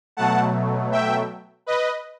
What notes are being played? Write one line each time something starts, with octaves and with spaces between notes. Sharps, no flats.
B2 F#3 A3 F#5 A5
E5 G5
B4 D#5